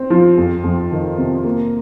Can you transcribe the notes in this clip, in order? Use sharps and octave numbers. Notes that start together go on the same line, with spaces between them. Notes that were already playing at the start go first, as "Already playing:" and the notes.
Already playing: C4
F3
F2
F2
D#3
C3
A#3